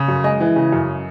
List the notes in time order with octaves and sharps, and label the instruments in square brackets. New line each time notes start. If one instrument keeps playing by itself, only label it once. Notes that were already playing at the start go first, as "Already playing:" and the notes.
Already playing: [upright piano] C#3
F#2
G#3 D#5
E3
C#3
F#2